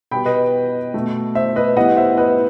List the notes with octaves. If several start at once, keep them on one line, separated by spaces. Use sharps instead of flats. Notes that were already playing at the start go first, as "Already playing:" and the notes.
B2 G3 B3 G5 B5
B4 D#5
B2 A3
C5 E5
B4 D#5
A2 G3 B3 D#5 F#5
C5 E5
B4 D#5